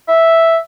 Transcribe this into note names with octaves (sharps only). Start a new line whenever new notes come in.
E5